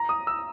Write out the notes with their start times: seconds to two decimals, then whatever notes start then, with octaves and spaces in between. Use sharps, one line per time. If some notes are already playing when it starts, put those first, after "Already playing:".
Already playing: A#5
0.09 D#6
0.27 E6